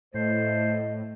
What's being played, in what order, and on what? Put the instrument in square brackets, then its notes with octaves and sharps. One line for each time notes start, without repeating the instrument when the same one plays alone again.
[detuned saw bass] A2 [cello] A3 [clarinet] C5 [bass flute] D#5